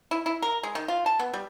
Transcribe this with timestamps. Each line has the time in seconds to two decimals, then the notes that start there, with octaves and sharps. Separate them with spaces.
0.11 E4
0.26 E4
0.42 A#4
0.63 G#3
0.75 D#3
0.88 F4
1.06 A5
1.19 B3
1.34 G3